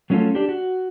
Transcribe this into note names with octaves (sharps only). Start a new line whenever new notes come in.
F#3 A3 C#4 E4 F4 A4
D4 G4
F#4